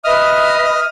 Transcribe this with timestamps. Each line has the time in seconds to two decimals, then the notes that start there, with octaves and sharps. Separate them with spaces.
0.04 B4 D#5 E5 D#6 F6